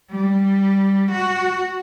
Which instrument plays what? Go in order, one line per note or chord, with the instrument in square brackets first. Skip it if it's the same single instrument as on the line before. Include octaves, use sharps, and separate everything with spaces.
[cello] G3
F#4